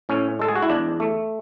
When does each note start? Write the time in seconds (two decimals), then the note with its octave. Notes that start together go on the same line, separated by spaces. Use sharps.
0.09 A2 C#4
0.39 G#3 A4
0.48 G#4
0.55 F#4
0.63 E4
0.70 E2 D4
1.00 A3